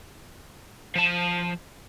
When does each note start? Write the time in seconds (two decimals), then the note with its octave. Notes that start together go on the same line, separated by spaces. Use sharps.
0.95 F3 A5